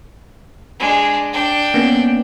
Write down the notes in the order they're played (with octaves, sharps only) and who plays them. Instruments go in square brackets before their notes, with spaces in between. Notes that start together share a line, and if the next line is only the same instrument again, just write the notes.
[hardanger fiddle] G#3 D4
D4 G5
[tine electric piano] A#3 B3 C#4